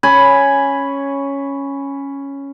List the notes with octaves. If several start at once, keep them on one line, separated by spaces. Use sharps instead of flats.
C#4 G#5 B5